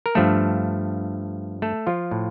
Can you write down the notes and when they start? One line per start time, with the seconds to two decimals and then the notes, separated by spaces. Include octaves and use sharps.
0.06 A#4
0.15 G2 F3 A3 A4
1.62 A3 A4
1.87 F3 F4
2.11 A2